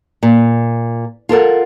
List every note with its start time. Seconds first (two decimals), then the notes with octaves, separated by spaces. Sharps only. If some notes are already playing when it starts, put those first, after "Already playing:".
0.23 A#2
1.29 F4 A4 A#4 F#5